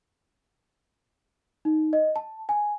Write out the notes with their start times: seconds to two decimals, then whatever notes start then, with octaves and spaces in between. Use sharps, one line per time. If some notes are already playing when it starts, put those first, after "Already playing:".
1.65 D#4
1.93 D#5
2.16 A5
2.49 G#5